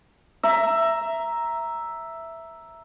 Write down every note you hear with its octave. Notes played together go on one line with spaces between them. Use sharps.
E5 A#5